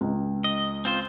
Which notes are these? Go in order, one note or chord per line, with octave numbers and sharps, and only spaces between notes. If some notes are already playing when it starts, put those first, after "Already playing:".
C#2
D#5
C4 F4 C5